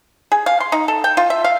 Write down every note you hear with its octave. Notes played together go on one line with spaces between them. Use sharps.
G#4
F5
C6
D#4
A4
G5
F4
E5
F5